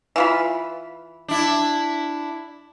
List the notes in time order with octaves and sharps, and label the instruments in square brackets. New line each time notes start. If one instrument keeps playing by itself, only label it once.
[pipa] E3 F4 B5
[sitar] D4 E4